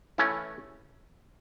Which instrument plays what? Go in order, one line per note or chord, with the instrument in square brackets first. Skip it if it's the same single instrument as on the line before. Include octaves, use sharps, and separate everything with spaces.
[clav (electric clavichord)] E3 A3 C#4 E4